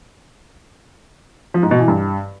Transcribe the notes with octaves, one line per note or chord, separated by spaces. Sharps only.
F3
G#2
B2
E3
G2